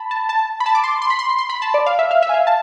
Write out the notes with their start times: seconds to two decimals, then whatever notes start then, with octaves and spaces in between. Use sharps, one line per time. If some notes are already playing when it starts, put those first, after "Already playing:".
Already playing: A5 B5
0.11 A5
0.29 A5
0.60 B5
0.66 A5
0.75 D6
0.84 C6
1.02 C6
1.10 B5
1.19 C6
1.39 C6
1.50 B5
1.62 A5
1.74 D5
1.86 F5
1.99 E5
2.11 F5
2.22 E5
2.29 G#5
2.34 F5
2.47 A5